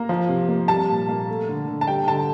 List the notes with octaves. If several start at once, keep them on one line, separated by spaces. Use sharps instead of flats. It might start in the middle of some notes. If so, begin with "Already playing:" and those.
Already playing: A#3 A#5
F3
C3
A#3
G3 A5
A#2
A#3
A3
D3
D3
A5
G3 G5
D3 A5